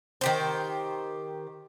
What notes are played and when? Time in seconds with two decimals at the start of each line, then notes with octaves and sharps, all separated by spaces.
0.21 D#3 G4 C5